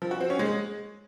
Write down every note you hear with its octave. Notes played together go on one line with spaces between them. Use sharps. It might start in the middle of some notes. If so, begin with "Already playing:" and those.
F3
F#4
C4
C#4
G#3